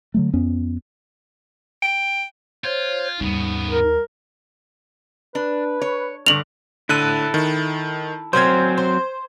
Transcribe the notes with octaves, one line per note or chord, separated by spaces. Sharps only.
D3 F#3 A3
F2 B3 C#4
G5
F4 C5 C#5
D#2 G#2 C#3 G3 B3
A#4
D4 B4
C#5
G2 D3 F7 F#7
D3 E4 A4 F#6 D#7
D#3
F#3 C4 C#4 A#4 C5 G6 G#6
C5